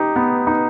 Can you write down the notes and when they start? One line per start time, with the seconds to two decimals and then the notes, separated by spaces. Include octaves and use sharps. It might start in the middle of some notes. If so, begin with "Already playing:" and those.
Already playing: D#4 G4
0.16 B3
0.47 D#4